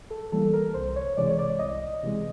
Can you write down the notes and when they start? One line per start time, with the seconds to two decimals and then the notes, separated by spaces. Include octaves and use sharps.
0.10 A4
0.32 E3 G3 A#3 A4
0.53 A#4
0.74 C2 C5
0.96 C#5
1.17 C3 E3 G#3 D5
1.30 C#5
1.39 D5
1.59 C2 D#5
2.03 C3 E3 G#3